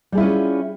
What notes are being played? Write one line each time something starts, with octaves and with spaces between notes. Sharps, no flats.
G3 C#4 E4 F4 G#4